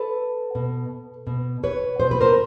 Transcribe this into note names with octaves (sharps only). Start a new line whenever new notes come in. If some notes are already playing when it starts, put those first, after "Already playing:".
Already playing: A4 B4
B2
B2
B4 C#5
B2 C5
B4
A#4 C5